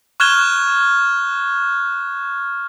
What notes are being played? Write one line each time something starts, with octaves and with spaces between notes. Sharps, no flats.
C#6 F6 F#6 G#6 E7 G7